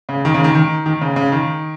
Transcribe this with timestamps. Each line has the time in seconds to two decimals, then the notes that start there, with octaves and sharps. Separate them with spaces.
0.09 C#3
0.25 D#3
0.34 C#3
0.44 D#3
0.55 D#3
0.86 D#3
1.01 C#3
1.16 C#3
1.32 D#3